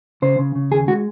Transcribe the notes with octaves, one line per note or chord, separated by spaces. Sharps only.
C#3 C5
C#3
C#3
D#2 G#4
G#3 F#4